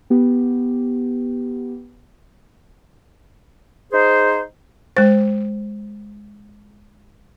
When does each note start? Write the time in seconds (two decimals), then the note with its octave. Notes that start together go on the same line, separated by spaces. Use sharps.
0.10 B3 G4
3.92 D#4 G#4 C5
4.97 G#3 C5